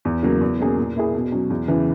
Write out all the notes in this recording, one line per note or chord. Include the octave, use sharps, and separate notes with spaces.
E2
C#3 F#3 A#3
E2
B2 A#3 C#4 G#4
A#2
A#3 E4 G#4
B2
F#3 C#4
E2
C#3 E3 B3